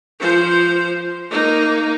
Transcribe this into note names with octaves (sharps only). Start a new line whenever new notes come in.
F3 C5
A#3 D#4